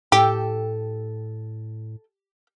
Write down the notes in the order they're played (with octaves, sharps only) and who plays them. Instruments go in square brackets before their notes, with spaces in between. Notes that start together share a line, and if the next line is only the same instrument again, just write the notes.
[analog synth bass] A2 [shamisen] G4 [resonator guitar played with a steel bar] A4 G5